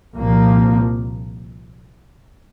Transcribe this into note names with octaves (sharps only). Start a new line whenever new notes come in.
C2 A#2 F3 A#3